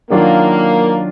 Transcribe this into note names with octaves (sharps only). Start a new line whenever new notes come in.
D#3 F#3 A#3 D4 F4